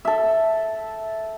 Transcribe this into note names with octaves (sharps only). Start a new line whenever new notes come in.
A4 E5